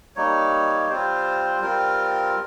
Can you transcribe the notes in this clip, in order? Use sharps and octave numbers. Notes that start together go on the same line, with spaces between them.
G3 A#3 D#4 C#5
G3 C4 F4 C5
G3 C4 F4 A#4